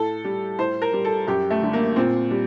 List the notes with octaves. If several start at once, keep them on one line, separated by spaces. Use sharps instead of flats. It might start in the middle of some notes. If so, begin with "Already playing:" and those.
Already playing: A2 A4
G3
A2 C5
A#4
G3
A4
F#2 G4
A3
D3 G3
A#3
A#2 C4
G3